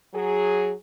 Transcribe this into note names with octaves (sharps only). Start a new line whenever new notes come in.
F#3 G#4